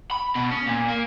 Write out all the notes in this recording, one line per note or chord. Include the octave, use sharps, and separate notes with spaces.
B5
B2
C#4
A#2
A#3